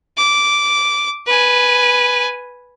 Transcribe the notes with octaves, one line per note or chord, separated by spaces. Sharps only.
D6
B4 G#5